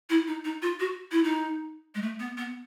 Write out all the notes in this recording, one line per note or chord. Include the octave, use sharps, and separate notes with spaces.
E4
D#4
D#4
F4
F#4
E4
D#4
G#3
A3
B3
B3